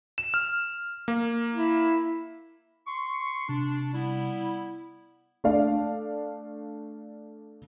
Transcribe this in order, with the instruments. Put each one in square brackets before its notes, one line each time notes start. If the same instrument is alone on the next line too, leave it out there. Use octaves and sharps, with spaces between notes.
[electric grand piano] E7
F6
A#3
[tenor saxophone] E4
[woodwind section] C6 C#6
[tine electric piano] C3 [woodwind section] D4
[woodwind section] G3 B3 E4
[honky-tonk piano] A3 D4 A4 D5 F5